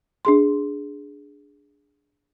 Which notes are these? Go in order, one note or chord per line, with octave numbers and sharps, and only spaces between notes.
D4 G#4 C6